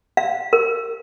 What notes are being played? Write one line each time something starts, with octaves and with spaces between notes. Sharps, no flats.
F5
A#4